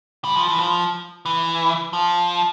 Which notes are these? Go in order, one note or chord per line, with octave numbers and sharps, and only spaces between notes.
G3
F3
E3
F3
E3
F3